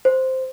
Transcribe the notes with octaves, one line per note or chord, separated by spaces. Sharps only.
C5